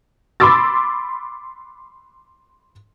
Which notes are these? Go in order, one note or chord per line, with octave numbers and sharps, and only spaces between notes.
B5 C6 D6 E6 A6